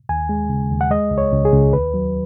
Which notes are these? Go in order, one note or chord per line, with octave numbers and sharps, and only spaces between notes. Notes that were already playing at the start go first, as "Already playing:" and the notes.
D#2 G#5
G#3
C#3
D#2
F#5
G#3 D#5
C#2
C#5
C#2
G#4
C#2
D#2 B4
F#3